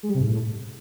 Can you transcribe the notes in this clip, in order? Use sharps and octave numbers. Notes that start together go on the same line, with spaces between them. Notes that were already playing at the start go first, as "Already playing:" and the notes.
G#3
G3
C3
G#2
A2